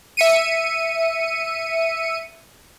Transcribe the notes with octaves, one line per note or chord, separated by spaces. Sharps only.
E5 C#7 D#7